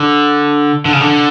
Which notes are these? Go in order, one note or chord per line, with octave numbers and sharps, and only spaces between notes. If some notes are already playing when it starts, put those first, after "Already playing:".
Already playing: D3
D3
C#3
D3